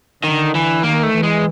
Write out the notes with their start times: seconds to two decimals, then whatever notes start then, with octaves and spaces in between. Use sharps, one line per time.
0.24 D3 D#3
0.55 E3
0.83 D#3 A#3
1.03 A3
1.14 E3
1.23 G#3